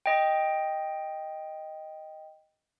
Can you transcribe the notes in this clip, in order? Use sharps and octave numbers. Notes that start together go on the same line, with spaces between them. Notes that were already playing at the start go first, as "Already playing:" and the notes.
D#5 G5